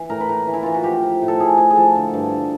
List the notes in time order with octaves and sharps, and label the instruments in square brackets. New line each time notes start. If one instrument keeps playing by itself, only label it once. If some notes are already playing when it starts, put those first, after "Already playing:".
Already playing: [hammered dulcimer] E3
A2 A#4
B4
A2 A#4
E3
E4
E3 F4
F#4
F3 G4
F3
A2
A4
A2 G#4
F3 G#4
G#4
F3 A4
D3
G2